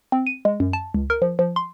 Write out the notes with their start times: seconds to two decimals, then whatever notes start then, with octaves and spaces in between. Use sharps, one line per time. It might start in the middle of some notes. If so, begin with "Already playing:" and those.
0.12 C4
0.27 D#7
0.45 G#3
0.60 F#2
0.73 A5
0.94 C#2
1.10 A#4
1.22 F3
1.39 F3
1.56 C6